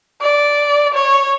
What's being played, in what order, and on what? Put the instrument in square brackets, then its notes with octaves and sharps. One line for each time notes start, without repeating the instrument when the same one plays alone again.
[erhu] D5
C#5